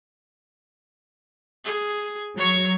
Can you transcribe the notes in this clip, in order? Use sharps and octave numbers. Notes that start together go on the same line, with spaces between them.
G#4
F#3 C#5 C#6